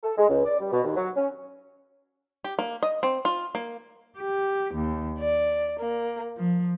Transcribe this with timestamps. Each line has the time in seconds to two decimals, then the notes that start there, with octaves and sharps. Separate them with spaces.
0.03 A4
0.17 G#3
0.29 C#2
0.45 D5
0.60 G3
0.72 B2
0.84 D#2
0.96 F#3
1.17 C#4
2.44 G4
2.59 A#3
2.83 D#5
3.03 C4
3.25 F4
3.55 A#3
4.18 G4
4.74 D#2
5.18 D5
5.79 A#3
6.37 F3